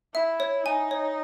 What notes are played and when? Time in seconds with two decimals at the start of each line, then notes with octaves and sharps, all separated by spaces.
0.14 E4 E5
0.40 C#5
0.66 D#4 G#5
0.91 C#5